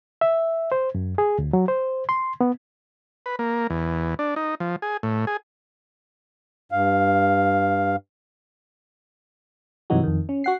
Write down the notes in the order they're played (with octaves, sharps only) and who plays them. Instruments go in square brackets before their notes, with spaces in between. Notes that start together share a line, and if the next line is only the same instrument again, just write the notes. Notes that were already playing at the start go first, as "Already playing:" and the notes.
[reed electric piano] E5
C5
F#2
G#4
D2
F#3
C5
C6
B3
[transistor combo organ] B4
A#3
E2
D4
D#4
F3
G#4
A2
G#4
[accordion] G2 F5
[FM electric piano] G2 C3 E3 F#3 D#4 F#4
F2 D#3
C#4
F#4 F#5 C7